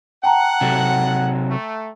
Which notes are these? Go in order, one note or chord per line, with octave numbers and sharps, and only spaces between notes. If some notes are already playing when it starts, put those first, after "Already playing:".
F#5 G5 A5 A#5
C3 F#3 A4
A3